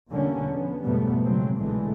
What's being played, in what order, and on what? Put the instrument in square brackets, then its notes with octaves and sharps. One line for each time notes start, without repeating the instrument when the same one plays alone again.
[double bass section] E2 B2 D3 G3 A#3 C#4
F3 B3
F2 G#2 B2 G3 A3 B3
C#3 F#3 G#3 C4
B1 A#2 D3 E3 G#3 A3